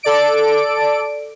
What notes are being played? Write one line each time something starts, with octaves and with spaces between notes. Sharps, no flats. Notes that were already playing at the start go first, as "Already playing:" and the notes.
A4 D5 D7